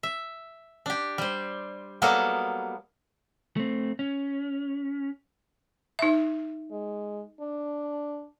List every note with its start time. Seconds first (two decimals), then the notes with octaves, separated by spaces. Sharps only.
0.03 E5
0.86 D4 G4
1.18 G3 C5
2.02 F#3 G3 A#3 B3 A4 A5
3.56 A3 C4
3.99 C#4
5.99 D#4 E5
6.71 G#3
7.41 D4